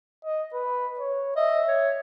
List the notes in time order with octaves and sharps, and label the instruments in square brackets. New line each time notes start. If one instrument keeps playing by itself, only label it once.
[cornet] D#5
B4
C#5
[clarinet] D#5 [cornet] E5
[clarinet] C#5